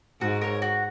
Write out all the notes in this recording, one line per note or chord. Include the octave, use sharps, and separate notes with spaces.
G#2 F#4
A#4 C#5
F#4